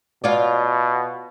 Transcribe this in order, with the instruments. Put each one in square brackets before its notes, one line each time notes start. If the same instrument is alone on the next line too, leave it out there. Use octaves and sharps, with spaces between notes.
[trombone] B2 [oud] F4 C#5 D5